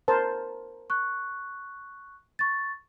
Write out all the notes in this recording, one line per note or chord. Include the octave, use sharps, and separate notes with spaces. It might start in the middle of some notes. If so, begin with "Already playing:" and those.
A#4 C5 A5
C#6 F#6
C#6 A6